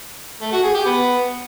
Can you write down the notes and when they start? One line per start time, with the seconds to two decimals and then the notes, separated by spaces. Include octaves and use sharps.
0.41 A3
0.52 F#4
0.63 G#4
0.74 G4
0.85 B3